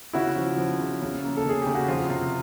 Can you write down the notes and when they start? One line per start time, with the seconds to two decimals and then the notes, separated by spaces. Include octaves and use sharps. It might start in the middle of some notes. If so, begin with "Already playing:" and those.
0.13 C#3 E4 F#4
0.36 F3
0.57 F3
0.79 C#3
1.02 C#3
1.23 A#3
1.37 A4
1.44 C#3
1.49 G#4
1.62 C#3 G4
1.75 F#4
1.88 F2 F4
2.09 C3 F4